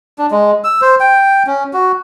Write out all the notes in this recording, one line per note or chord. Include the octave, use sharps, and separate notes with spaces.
D4
G#3
E6
C5
G5
C#4
F#4